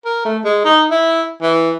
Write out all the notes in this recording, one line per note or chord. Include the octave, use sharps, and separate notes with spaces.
A#4
A3
G#3
D#4
E4
E3